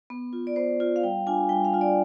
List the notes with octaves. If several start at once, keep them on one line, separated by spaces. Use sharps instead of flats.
B3
F4
D5
B3 C5
F4
F5
G3 G5
D4 F4 G#5
G3 G5
F5
D4 F4
D5